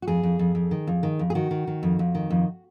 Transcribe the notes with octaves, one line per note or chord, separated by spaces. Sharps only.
F#4
F2 G#4
F2
F2
F2
D#3
F2
D#3
F2
G#4
D#3 F#4
D#3
D#3
F2
F2
D#3
F2